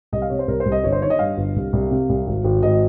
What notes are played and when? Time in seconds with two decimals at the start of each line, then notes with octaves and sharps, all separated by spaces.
0.12 C2 D#5
0.22 F5
0.30 C3 C#5
0.39 C5
0.48 C2 A#4
0.60 C5
0.66 C2
0.72 D#5
0.84 G1 C#5
0.92 C5
1.02 D#3 C#5
1.10 D#5
1.19 G2 F5
1.37 G1
1.56 C2
1.73 C2
1.91 C3
2.09 C2
2.27 G#1
2.44 G#1
2.63 G#1 D#5